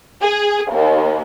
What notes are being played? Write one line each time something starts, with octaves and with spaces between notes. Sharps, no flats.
G#4
D#2